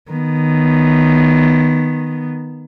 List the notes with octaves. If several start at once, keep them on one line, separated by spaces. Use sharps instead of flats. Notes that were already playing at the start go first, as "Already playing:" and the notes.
D#3 B3